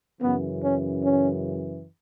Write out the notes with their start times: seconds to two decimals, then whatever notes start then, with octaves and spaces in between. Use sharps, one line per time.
0.21 F#2 C#3 E3 B3
0.63 C#4
1.05 C#4